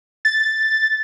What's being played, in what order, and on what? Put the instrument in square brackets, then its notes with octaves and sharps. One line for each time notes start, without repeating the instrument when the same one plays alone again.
[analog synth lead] A6